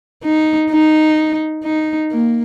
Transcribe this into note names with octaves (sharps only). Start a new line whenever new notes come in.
D#4
D#4
D#4
A#3